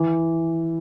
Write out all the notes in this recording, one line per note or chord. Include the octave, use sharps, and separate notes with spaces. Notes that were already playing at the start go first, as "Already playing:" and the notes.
Already playing: E3